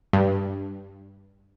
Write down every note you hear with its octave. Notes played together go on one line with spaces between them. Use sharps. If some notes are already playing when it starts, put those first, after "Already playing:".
G2